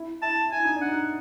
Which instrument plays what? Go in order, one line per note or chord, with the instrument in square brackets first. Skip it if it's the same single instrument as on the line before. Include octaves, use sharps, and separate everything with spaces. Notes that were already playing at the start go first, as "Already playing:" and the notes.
Already playing: [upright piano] E4
[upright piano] E4 [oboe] A5
[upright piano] E4 [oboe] G#5
[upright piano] D#4
D4
[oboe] F#5
[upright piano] D#4